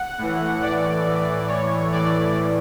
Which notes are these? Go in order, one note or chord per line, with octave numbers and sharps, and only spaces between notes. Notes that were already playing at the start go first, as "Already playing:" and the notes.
Already playing: F#5
A2 E3
D5
A2 E3
C#5
A2 E3 D5